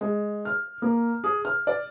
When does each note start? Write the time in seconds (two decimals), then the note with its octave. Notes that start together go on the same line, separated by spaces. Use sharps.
0.01 G#3
0.45 F6
0.82 A#3
1.24 G#4
1.45 F6
1.67 D5